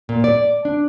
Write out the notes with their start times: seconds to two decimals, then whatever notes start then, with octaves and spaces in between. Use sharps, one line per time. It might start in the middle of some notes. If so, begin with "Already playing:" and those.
0.09 A#2
0.24 D5
0.65 D4